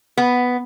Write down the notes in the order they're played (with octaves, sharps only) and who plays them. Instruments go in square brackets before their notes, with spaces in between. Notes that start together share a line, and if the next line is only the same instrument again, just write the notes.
[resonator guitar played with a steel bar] B3